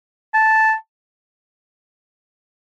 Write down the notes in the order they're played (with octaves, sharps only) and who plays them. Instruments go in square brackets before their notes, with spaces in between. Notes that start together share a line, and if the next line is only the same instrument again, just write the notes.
[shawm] A5